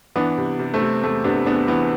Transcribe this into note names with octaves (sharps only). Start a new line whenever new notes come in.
E3 B3 D4
C3
C3
A3 C4
C3
E2 A3
C3 B3 D4
E2 B3 D4
E3 B3